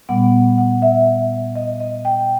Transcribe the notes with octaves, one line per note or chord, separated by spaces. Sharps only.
A#2 G3 B3 F#5
F#5
E5
D#5
D#5
G5